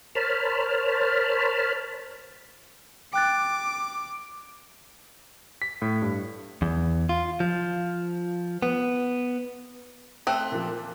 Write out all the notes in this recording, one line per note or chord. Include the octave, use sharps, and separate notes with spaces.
A#4 C5 C#5 A5 B5 F6
G5 D6 F#6 A6
B6
A2
G2
E2
F4
F3
B3
A3 C4 F#6
A#2 F3